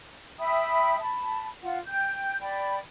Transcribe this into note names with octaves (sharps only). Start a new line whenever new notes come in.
E5 G5 B5 D#6
A5 B5
F4 F#5
G5 G6
D5 G5 B5